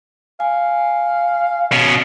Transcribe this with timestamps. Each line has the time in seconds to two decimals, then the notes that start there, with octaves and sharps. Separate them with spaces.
0.40 F5 G#5
1.72 B2 C#4